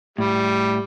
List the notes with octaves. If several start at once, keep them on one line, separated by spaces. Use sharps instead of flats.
A2 G3